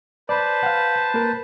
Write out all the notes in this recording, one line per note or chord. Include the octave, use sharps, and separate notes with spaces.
B4 C5 D5 A5 B5
F5 F#5
A#3 A#4